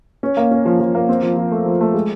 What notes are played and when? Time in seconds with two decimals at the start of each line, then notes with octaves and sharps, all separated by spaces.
0.23 C#4
0.37 A#3
0.51 C#4
0.65 F3
0.80 F3
0.95 A#3
1.09 C4
1.23 F3
1.37 F3
1.52 A3
1.66 F3
1.81 A3
1.94 G#3